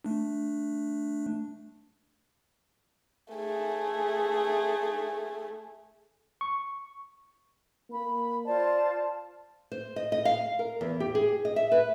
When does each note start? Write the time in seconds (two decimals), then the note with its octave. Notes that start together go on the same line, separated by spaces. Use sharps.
0.04 A3 D4
3.34 A3 G#4
6.41 C#6
7.90 A#3 B5
8.46 F4 C5 D5 A5
9.72 C5
9.96 D#5
10.12 D#5
10.25 F5
10.59 A#4
10.81 E2
11.00 G4
11.15 G#4
11.45 D#5
11.56 E5
11.72 B4